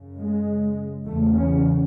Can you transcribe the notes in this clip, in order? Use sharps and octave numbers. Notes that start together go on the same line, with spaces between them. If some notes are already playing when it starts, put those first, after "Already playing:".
Already playing: F#2 C#3
G#3
E2 C#3 A3
C#4